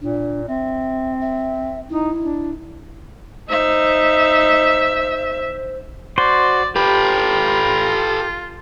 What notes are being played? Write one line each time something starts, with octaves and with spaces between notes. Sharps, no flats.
A#2 D4
C4 E5
E5
D#4 E4
D4
D#4 C5 E5
F#4 C5 D5 C6
F4 G4 A4 B4